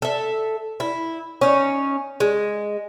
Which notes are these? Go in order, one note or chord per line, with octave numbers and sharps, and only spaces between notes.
A4 E5
E4
C#4 D#4
G#3